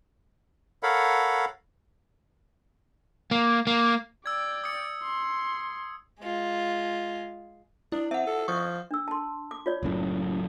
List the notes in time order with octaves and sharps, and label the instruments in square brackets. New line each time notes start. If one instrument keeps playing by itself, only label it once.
[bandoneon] A4 A#4 C#5 F5 F#5 B5
[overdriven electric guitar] A#3
A#3
[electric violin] D5 G5 [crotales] E6 G#6
[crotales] D#6 C#7
[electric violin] C6
[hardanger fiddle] G#3 F4
[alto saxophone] D4 [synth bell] E4
[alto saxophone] C4 [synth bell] E5 F#5
[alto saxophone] A4
[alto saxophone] F3 [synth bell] C#6 D#6
[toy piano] D4 E6
A5 C6
D6
F4 C#5 D5
[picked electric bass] F#1 F#2 A2